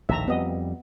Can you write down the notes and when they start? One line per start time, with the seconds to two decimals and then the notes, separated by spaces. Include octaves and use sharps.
0.09 A#1 D#2 A2 E5 A#5
0.28 F2 G3 B3 D#5